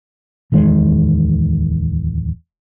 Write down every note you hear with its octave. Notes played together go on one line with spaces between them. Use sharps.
D1 E2 D#3 G#3